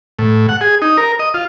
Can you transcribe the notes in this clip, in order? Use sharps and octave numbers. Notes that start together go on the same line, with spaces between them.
A2
F#5
G#4
D#4
A#4
D#5
F4